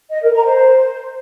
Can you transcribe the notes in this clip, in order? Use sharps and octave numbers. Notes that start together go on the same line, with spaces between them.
D#5
A#4
A#5
C5